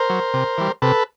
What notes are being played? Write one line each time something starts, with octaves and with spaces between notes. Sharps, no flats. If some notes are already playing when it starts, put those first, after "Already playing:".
Already playing: A#4 C5
F#3
C3
E3 G3
C3 A4 B4